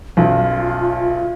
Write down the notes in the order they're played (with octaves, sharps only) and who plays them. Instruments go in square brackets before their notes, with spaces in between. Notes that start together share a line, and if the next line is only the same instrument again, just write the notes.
[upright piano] B1 F#2 [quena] F4